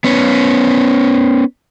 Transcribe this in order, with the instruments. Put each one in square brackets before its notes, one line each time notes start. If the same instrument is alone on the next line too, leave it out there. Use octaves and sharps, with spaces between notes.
[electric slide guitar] B3 C#4